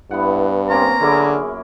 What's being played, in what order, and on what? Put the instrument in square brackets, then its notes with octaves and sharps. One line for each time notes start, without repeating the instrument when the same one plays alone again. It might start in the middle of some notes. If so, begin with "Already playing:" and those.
[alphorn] G2 [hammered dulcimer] B3 F#5 [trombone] E4
[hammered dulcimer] A#3 C#4 F4 [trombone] C4 [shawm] A#5
[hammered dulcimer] F#2 E4 D6 [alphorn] D3 [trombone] G#4